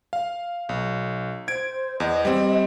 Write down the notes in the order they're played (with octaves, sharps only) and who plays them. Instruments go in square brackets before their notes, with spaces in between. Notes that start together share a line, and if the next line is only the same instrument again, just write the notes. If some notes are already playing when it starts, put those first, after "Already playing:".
[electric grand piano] F5
B1
[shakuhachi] C5 [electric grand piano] G#6 D7
[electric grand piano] E2 [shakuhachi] D#5
[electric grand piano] G3 C4